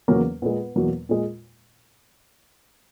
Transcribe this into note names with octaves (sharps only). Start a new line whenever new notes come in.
E2 C#3 F#3 A#3 C#4
A#2 G#3 B3
E2 B2 F#3 A#3
A#2 G#3